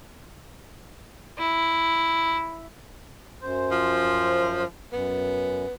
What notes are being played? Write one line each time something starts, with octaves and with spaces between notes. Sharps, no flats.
E4
F#2 C5
F3
F#2 B3